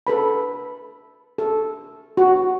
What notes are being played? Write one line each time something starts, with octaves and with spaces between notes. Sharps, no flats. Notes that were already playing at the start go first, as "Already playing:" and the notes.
A4 B4 B5
A4
F#4